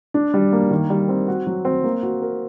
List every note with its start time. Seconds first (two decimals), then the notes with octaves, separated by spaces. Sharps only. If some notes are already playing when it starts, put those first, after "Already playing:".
0.14 D4
0.34 G3
0.52 A#3
0.71 D#3
0.90 G3
1.09 C4
1.28 F#4
1.47 F#3
1.65 C4
1.84 A#3
2.03 F#4
2.22 A#4